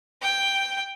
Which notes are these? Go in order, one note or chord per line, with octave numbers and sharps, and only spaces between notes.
G5